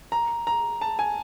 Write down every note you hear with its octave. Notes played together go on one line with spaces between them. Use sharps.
A#5
A#5
A5
G#5